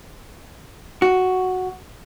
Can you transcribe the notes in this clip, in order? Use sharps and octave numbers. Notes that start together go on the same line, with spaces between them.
F#4